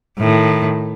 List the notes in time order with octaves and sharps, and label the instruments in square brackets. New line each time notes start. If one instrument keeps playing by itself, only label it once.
[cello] A2 D#3